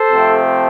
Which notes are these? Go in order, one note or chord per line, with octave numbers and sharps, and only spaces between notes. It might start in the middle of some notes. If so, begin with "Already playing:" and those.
Already playing: A4 C5
C3 F3 A3 C4